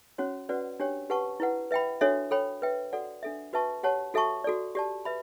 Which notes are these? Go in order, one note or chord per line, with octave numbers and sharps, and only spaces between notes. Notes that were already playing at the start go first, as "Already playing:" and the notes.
C#4 F#4 C#5
C#4 F#4 B4 D5 F#5
D4 G4 C#5 G5
G4 B4 F#5 A5 C#6
E4 B4 F#5
B4 E5 G5 B5
D4 F#4 A4 C#5 E5
A4 C#5 G5 B5
B4 E5 G5
F#4 A4 D5 F#5
D4 A4 E5
F#4 B4 E5 A5 C#6
G4 C#5 F#5 A5
F#4 A4 E5 A5 C#6
F#4 A4 D5
G4 D5 A5
B4 E5 B5